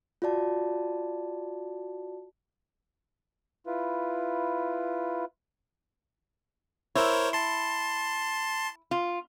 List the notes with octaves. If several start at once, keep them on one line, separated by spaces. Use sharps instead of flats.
F4 F#4 D5 A5
E4 F4 B4
E4 A#4 C5 C#5
A5 C6
F4